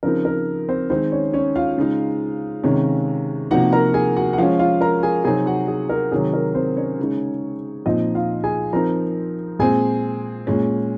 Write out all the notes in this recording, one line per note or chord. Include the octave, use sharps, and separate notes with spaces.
C#3 F3 C4 D#4 A#4
A#4
C4 C5
D#3 G#3 C4 D#4 C5
C#4 C#5
C#4 C#5
F4 F5
C#3 G#3 D#4
C3 D#3 G#3 C#4
C3 F3 A#3 D#4 F#4 F#5
A#4 A#5
G#4 G#5
F#4 F#5
F#5
F3 G#3 C#4 F4 F5
F4 F5
A#4 A#5
G#4 G#5
C3 F#3 C4 D#4 G#4 G#5
F#4 F#5
G#4
A#4
C3 D#3 F#3 G#4
A#4
C4 C5
C#4 C#5
C#3 G#3 D#4
A#2 F3 C4 D#4 D#5
F4 F5
G#4 G#5
F3 C4 D#4 A#4 A#5
A#2 G#3 C4 G#4 G#5
A#2 G#3 C#4